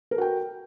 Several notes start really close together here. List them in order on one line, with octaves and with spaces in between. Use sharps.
A#4 A4 F#4 G5